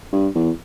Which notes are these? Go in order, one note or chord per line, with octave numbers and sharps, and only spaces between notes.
G2
E2